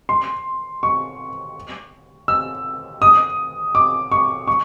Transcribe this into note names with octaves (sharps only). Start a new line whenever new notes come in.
C6
C#6
E6
D#6
D6
C#6
C#6